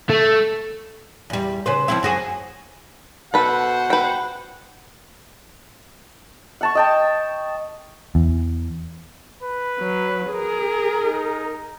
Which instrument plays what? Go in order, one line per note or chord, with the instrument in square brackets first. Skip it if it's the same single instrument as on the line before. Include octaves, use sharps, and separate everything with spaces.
[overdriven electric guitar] A3
[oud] E2 G3
C#3 B4 C5
F3 C4 E4
F#2 F#4 G#4
[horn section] B2 C5 F#5 [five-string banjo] A4 B4
[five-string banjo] B4 G5
[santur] F#5 A5 C#6
D#5 G5 A5
[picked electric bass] E2
[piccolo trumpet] B4
[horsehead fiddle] F#3
G#4 A#4
[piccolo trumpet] D#4